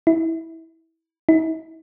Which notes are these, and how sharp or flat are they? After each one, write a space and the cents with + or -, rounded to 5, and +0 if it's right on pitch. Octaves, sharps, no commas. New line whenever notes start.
E4 -20
E4 -45